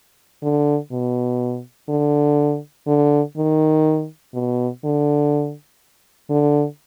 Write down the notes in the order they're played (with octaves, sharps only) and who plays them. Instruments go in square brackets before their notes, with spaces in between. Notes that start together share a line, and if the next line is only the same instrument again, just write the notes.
[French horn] D3
B2
D3
D3
D#3
B2
D3
D3